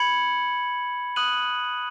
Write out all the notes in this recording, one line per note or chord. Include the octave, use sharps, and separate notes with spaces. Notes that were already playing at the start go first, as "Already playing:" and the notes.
Already playing: B5 G#6 C#7 F#7
D#6 F#6 D#7 F#7